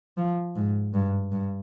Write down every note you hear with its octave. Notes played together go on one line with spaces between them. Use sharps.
F3
G#2
G2
G2